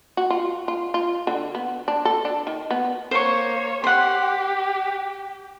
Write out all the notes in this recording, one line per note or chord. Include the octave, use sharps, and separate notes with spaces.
F#4
F4
F4
F4
D3
B3
D4
A4
D4
D#3
B3
A#3 C5 C#5 C#6
G4 F#5 C6